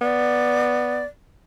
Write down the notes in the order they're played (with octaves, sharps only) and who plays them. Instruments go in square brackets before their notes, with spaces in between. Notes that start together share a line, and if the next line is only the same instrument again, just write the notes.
[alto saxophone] B3 [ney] D5